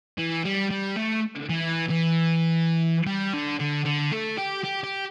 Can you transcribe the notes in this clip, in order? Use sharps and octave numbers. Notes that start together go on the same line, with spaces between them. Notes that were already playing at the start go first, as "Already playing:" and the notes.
E3
G3
G3
A3
E3
E3
G3
D3
D3
D3
A3
G4
G4
G4